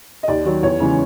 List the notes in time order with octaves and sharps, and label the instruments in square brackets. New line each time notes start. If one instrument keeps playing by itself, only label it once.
[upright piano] D#5
D#2 D5
D#3 F#3
E2 C#5
C#3 E3 G#3